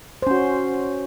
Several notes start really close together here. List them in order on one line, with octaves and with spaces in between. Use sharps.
C5 C#4 F#4